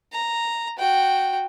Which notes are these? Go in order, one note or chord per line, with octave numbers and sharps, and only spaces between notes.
A#5
F#4 G5